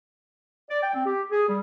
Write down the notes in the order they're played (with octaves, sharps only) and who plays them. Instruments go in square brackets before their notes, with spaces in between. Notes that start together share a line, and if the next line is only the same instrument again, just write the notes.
[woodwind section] D5
G5
C4
G4
G#4
G3